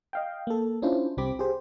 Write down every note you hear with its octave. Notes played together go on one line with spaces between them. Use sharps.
D#5 F5 G5
A#3 A4
C#4 D4 E4 F4 C5
C2 C3 C4 G4 B5 D6
G4 G#4 C5